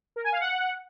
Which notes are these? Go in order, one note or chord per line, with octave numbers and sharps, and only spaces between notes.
A#4
G#5
F5
F#5